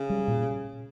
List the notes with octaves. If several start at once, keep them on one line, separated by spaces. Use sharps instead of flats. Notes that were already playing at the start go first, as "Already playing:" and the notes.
Already playing: C#3
G3
A#2